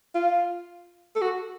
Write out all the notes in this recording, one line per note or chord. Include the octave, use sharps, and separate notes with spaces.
F4
A4
F#4